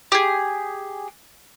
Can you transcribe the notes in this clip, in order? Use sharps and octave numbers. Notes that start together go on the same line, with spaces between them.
G4 G#4